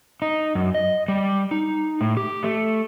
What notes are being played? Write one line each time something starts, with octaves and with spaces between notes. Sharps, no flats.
D#4
F#2
D#5
G3
D#4
A2
G4
A3